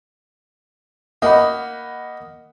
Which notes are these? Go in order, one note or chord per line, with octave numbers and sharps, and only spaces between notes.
A#3 D#4 D#5 F#5 B5